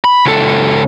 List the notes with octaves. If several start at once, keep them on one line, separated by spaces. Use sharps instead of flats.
B5
C#2 A4